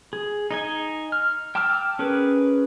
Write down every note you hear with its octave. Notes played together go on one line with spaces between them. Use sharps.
G#4
D#4 D#5 G#5
F6
G5 A5 D6 E6 F6
C#4 G#4 A#4 B4